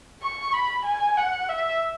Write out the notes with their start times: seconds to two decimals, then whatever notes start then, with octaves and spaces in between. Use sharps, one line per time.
0.23 C#6
0.53 B5
0.86 G#5
1.17 F#5
1.49 E5